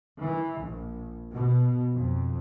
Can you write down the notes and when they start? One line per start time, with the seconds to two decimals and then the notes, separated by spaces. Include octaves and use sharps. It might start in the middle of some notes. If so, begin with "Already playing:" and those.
0.21 E3
0.63 A#1
1.33 B2
1.98 F2